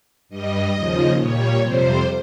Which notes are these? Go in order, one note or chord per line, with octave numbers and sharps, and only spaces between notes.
G2 G3 D#5
D#2 C#3 F3
A#2 G3 C#5
F2 C3 G3 C5